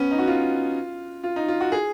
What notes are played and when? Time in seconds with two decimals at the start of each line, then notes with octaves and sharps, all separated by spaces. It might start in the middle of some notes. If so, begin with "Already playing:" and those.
Already playing: B3 C#4
0.11 D#4
0.19 F#4
0.27 F4
1.24 F4
1.36 D#4
1.48 F4
1.61 F#4
1.72 G#4